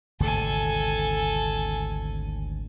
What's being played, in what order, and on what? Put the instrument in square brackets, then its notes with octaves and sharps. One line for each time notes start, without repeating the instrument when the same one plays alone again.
[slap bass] G#1 D2 C3 [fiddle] A4 G#5